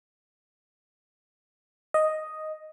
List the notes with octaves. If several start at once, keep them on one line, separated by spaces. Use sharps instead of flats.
D#5